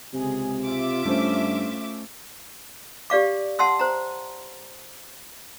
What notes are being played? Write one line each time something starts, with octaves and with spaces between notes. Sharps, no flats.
C#2 C3 G#4
F4 E5 D6
G2 A3 C#4 C5
G4 D5 F5 D6
F#5 A5 C6 E6
C5 A#5